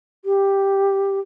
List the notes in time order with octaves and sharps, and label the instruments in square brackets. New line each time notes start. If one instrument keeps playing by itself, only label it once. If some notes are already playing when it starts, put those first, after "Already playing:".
[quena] G4